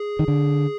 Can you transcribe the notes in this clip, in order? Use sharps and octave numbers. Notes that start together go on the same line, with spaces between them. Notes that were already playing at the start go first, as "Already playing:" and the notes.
Already playing: G#4
D#3
D3